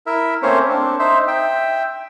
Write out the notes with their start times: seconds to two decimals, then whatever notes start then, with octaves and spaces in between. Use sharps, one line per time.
0.07 E4 A#4 E5
0.43 A3 A#3 C4 C#4 C5 C#5
0.69 C4 D4
0.99 D#4 C5 E5
1.28 E5 G5